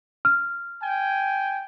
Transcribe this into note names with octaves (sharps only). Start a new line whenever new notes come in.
F6
G5 G#5